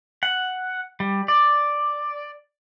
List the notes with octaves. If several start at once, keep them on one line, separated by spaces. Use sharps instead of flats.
F#5
G3
D5